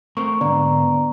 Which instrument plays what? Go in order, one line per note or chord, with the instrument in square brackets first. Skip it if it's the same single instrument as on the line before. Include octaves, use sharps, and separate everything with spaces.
[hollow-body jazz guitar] A3 C4 A#4 [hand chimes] C#6
[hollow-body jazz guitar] G#2 D3 [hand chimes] B3 D5 A#5